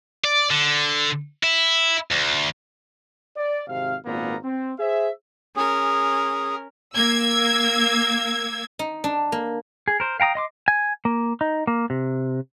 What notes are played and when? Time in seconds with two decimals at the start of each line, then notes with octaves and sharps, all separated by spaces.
0.24 D5
0.51 D3
1.43 E4
2.12 D2
3.36 D5
3.68 G#1 C3 F5
4.05 G#1 A#2 A#3 B3 A#5
4.44 C4
4.79 G#4 C5 E5
5.56 C#4 G#4 A#4
6.94 A#3 E6 G#6
8.79 D#4
9.04 D4
9.32 A#3
9.88 G#4
10.00 A#4 C5
10.20 F5 G5 A#5 D#6
10.35 D#5 C6 D6
10.68 G#5
11.05 A#3
11.41 D#4
11.67 A#3
11.90 C3